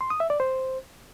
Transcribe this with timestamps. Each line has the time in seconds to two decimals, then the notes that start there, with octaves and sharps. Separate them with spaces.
0.01 C6
0.10 D#6
0.20 E5
0.30 D5
0.40 C5